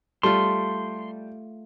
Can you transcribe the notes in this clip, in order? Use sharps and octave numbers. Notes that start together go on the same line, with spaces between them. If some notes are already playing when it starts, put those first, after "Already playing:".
G3 A3 F4 C6